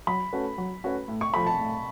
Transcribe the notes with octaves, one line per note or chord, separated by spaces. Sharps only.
F#3 B5
A3 C#4 F#4 B4
F#3
A3 C#4 F#4 B4
A2
C#6
F3 A3 B5
A5
A2